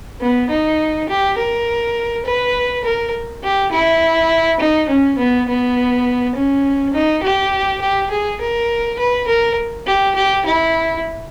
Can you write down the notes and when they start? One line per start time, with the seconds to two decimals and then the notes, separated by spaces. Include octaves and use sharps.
0.21 B3
0.50 D#4
1.09 G4
1.37 A#4
2.25 B4
2.84 A#4
3.43 G4
3.72 E4
4.60 D#4
4.89 C#4
5.18 B3
5.48 B3
6.35 C#4
6.94 D#4
7.23 G4
7.82 G4
8.11 G#4
8.41 A#4
8.99 B4
9.28 A#4
9.87 G4
10.15 G4
10.46 E4